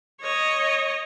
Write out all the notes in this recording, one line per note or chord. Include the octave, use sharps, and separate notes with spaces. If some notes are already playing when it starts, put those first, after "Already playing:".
C#5 D#5